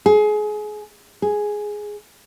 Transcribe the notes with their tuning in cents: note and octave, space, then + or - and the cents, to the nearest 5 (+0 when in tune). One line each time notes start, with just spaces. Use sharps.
G#4 +25
G#4 +5